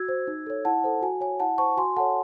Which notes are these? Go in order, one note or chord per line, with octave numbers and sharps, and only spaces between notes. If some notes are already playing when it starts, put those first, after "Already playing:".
Already playing: F#4 E6 G#6
C5
D#4
A4 C#5
E4 F#5 A5
A4 C5
F#4 G#5
C#5 G#5
E4 F#5 A5
C5 A5 C#6
F#4 G#5 C6
A4 C#5 F#5 A5